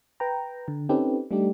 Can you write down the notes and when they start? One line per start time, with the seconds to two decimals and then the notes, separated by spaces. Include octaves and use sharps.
0.20 B4 G5 A#5
0.68 D3
0.89 C4 C#4 D#4 G4 A4 B4
1.31 G3 A3 D4 D#4 G4